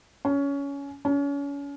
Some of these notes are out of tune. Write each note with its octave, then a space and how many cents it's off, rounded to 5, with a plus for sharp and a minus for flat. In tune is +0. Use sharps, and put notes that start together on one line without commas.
C#4 +20
C#4 +35